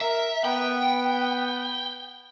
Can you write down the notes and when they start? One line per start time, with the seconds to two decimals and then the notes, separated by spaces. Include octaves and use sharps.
0.01 A#4 E5
0.45 B3 G5